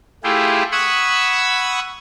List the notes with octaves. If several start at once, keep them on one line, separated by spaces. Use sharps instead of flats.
A3 E4 F4 G4 G#4
F#5 B5 C#6 D#6 E6 G#6